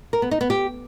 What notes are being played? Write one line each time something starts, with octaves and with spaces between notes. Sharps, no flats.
A#4
B3
D#4
B3
G4